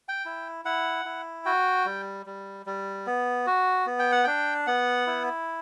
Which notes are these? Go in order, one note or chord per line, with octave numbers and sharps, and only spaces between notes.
G5
E4
E4 F#5
E4
F#4 G5
G3
G3
G3
B3
F#4
B3
G5
F#5
D4 G5
B3 F#5
E4